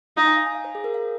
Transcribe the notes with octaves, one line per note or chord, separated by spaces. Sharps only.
D#4 F5
G#5
F5
G#5
F5
C5
G#4
A#4
F5